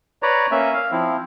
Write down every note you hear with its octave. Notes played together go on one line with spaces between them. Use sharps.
B4 C#5 D5 A#5
A#3 C#4 E5
F5
F3 C4 E4